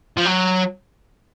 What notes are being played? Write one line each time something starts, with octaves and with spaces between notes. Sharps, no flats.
F3
F#3